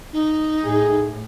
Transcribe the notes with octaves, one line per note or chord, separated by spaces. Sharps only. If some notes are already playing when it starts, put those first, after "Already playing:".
D#4
A2 G#4